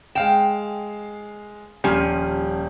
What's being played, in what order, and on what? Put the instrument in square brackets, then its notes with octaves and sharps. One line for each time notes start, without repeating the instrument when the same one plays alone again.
[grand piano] G#3 F5 E7 [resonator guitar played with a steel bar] G5
[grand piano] D#1 G3 [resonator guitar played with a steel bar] F3 C#4 G#5